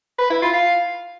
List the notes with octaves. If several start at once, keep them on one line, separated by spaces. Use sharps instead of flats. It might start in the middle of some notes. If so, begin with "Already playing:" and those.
B4
E4
F4
F5